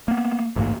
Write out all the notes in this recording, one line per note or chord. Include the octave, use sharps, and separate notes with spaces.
A#3 B3
A1 D2 G#2 A#3